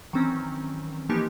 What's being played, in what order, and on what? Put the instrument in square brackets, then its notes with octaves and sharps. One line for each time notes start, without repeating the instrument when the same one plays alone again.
[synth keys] D#3 E3 F#3 C4 C#4
E3 F3 A#3 B3 D#4 G4